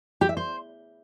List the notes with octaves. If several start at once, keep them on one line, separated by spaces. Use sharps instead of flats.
G4
E5
C5